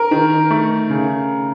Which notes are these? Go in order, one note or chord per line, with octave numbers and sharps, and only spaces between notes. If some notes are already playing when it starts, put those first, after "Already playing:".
Already playing: A#4
D#3
A3
C#3